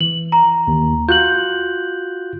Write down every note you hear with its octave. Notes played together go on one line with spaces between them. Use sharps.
E3 F#7
A#5
D#2
F4 F#4 F#6 G6 F#7